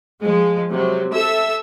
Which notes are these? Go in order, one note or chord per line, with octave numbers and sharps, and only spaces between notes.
F3 G#3
C3 F#3
A4 E5 E6